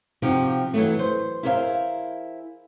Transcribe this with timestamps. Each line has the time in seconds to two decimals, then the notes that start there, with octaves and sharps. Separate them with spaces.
0.22 C3 F3 C4 D#4 F#4 G4
0.74 E3 F#3 A3
0.99 C5
1.43 E4 G#4 A#4 C5 C#5 F5